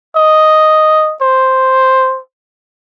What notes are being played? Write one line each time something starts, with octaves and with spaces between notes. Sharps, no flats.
D#5
C5